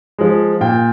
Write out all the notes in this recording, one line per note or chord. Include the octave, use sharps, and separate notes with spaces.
F3 G#3
A#2 G5